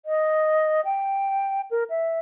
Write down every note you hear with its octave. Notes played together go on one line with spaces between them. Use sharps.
D#5
G5
A#4
E5